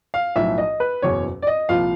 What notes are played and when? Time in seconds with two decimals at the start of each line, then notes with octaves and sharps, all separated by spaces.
0.14 F5
0.36 B1 A2 F3 E5
0.58 D#5
0.80 B4
1.02 F#1 E2 B2 C#5
1.42 D5
1.47 D#5
1.69 C2 A#2 F3 F5